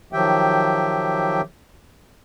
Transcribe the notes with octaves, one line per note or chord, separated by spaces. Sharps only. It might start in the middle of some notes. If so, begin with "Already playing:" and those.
D#3 F3 F#3 G4 E5 G5